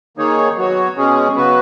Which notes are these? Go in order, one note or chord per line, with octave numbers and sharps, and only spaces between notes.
D#3 A#3 D#4 G#4 C#5
F#3 B3 F#4 C#5
B2 G#3 C#4 G#4
C#3 F#3 B3 F#4 B4